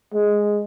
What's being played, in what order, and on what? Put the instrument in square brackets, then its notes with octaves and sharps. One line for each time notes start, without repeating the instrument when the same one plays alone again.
[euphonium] G#3